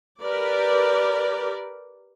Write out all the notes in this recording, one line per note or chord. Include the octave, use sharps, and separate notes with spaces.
G4 A#4 B4 D5